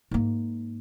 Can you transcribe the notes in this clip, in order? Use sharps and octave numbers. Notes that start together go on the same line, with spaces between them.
G#2 A#3